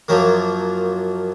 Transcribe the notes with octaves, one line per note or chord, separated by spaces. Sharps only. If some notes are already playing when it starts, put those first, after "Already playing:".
F#2 F3 F#3 A#3